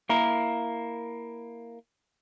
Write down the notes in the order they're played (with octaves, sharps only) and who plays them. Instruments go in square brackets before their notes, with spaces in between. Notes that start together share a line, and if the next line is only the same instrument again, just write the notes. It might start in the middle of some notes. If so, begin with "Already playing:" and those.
[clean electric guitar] A#3 E4 A#4